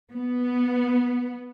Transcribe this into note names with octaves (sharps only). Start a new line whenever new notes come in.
B3